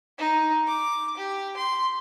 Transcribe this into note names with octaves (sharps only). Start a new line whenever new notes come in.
D#4
D6
G4
C6